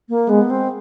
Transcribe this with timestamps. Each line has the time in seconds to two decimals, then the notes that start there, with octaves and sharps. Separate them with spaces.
0.09 A#3
0.29 G#3 B3
0.50 C4